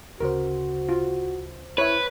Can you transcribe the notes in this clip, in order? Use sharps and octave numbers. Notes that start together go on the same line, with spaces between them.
D2 C#3 F#4 A#4 C5
F4
E4 B4 C#5 E5